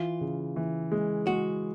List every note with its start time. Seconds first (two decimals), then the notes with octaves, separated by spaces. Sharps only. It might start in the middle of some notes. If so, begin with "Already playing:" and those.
Already playing: E3 F4
0.21 C#3
0.56 E3
0.92 G#3
1.27 G#3 F#4